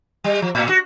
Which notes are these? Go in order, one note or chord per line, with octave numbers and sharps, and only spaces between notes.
G3
F3
A2
F#4